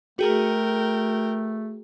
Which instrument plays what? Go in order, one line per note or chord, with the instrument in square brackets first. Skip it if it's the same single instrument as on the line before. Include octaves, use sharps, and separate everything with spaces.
[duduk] A3 [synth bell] F#4 G#4 [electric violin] A#4 G5